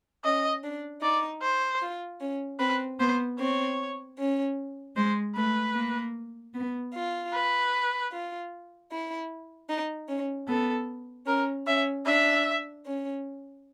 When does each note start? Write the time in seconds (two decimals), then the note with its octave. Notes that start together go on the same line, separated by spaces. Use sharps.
0.24 C#4 D#5
0.63 D4
1.02 D#4 D5
1.41 C5
1.82 F4
2.20 C#4
2.59 C4 B4
2.99 B3 C5
3.39 C4 C#5
4.18 C#4
4.96 G#3 C5
5.35 A3 B4
5.75 A#3
6.54 B3
6.94 F4
7.33 B4
8.11 F4
8.91 E4
9.68 D#4
10.08 C#4
10.48 B3 A4
11.26 C#4 A#4
11.66 C#4 E5
12.05 D4 E5
12.85 C#4